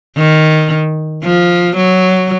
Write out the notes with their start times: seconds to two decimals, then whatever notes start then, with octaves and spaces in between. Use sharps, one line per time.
0.18 D#3
1.24 F3
1.77 F#3